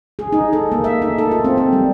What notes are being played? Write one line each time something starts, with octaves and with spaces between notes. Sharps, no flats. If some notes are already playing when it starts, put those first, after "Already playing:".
G#4
D#4
A4
A#3
E5
D#4
A4
F4
C4
C4
G3